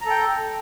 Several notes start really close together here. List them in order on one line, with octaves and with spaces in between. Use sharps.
A#5 A4 G5